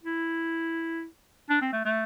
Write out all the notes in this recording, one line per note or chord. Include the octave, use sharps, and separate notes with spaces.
E4
D4
C4
A3
A3